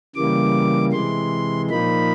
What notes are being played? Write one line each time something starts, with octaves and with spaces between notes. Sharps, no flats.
C#3 E3 G3 A#3 D6
C3 E3 G#3 C6
A#2 F3 A#3 D#4 B5